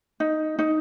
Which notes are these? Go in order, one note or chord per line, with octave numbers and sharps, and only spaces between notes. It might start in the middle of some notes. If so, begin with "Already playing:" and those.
D#4
D#4